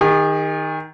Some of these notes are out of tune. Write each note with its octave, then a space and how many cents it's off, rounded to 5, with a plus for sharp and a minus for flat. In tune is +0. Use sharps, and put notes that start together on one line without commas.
D#3 +0 G#4 -45